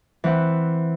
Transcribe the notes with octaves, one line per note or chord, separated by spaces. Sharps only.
E3 C4 F#5